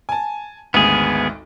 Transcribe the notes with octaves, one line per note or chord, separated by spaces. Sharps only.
G#5 A5
G#1 D2 B3 G#4